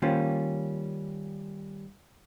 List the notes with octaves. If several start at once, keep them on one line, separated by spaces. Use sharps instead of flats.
D#3 G3 A#3 C#4 F4 C5